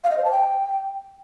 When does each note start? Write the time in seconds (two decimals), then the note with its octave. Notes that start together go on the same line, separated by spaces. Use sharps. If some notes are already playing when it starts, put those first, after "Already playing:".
0.04 F5
0.11 D#5
0.17 C5
0.24 A5
0.31 G5